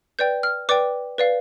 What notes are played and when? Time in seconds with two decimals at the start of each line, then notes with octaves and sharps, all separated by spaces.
0.19 B4 D5 G5 G6
0.43 F6
0.69 B4 D5 G5 D6
1.18 B4 D5 F5